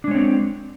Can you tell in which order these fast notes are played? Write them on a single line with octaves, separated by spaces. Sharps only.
D4 G#3 C#5 C4